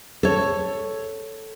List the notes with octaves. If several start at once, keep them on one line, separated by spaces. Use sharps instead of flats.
A4 C#5